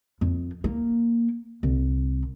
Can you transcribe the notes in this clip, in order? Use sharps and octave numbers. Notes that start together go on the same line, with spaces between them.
F2
A#3
C2